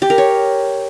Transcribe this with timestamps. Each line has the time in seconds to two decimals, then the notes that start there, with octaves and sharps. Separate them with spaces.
0.02 G4
0.10 A#4
0.18 C#5